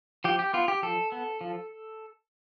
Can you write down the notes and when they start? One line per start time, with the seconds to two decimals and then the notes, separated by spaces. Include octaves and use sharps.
0.24 F3 G4
0.39 G4
0.53 B3 F4
0.68 G4
0.82 F3 A4
1.12 B3
1.41 F3